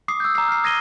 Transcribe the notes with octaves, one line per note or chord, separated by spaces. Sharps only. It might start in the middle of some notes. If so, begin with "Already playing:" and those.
D6 D#6 C7
E6 G6
A#5 C7
F6 C7
D#6 G#6 A#6 C7 D#7 G7